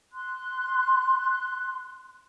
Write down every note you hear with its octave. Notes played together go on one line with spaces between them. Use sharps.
C6 F#6